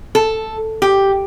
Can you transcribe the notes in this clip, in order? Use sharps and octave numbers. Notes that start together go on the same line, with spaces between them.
A4
G4